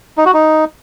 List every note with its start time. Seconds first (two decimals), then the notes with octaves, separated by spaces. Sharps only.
0.18 D#4
0.26 F#4
0.34 D#4